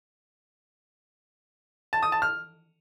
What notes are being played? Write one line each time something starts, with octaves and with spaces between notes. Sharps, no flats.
A5
D#6
A5
F6